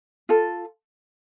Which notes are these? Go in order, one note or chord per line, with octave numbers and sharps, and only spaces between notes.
F4 A4